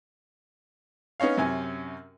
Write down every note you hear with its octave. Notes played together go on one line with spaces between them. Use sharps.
B3 C#4 D#4 C#5 F5
F#2 C3 C#4 G#5